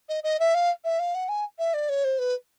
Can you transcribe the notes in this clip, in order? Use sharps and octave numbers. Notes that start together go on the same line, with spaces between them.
D#5
D#5
E5
F5
E5
F5
F#5
G#5
E5
D5
C#5
C5
B4